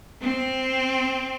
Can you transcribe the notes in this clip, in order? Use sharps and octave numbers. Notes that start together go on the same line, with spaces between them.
C4